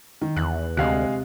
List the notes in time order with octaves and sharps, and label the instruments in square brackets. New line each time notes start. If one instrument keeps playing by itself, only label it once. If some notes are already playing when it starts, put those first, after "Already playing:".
[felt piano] D#3
[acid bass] E2 [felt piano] F#6
[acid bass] D2 [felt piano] C3 [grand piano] G#3 F5 F#6